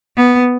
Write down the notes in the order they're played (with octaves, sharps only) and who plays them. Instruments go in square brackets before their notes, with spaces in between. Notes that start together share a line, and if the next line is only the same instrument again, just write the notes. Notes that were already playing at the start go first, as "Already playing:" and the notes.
[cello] B3